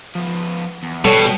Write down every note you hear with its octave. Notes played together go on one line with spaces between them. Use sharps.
F3 B3
E2
B2 G3 A4 C#5 F#5 G5